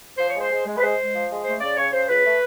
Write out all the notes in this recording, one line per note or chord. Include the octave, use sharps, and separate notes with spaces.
F3 C5
G#3 C#5
C5
G#3
G#3
B4
G#3 C5
G#3
F3
G#3
A3 C5
C#3 D5
C#3 C#5
C#3 C5
C#2 B4
A3